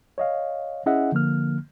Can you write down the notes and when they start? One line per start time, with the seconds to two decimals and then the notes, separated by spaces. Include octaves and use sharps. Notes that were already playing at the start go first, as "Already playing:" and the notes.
0.18 C#5 D#5 F5
0.86 C#4 E4 G#4 D#5 E5 F#5
1.12 D3 F3 A#3 F6